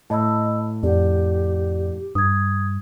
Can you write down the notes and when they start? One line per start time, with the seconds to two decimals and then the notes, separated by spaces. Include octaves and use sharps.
0.10 A2 D#5 A5 B5 E6
0.83 F2 G4 D5 F#5
2.15 G2 D#6 G#6